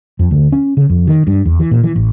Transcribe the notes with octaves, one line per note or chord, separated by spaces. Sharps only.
F2
D2
C#4
C#3
F2
D#3
G2
E2
E3
A#2
E3
A1